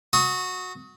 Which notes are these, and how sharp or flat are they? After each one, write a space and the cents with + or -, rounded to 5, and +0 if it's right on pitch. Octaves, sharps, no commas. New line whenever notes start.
F#4 -15 D#6 +35